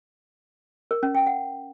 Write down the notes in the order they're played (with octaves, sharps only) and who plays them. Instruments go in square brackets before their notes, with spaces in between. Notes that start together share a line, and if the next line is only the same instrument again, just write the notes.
[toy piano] A#4
C#4
G5
F#5